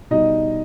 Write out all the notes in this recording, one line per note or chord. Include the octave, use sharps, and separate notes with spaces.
B2 G3 D#4 D#5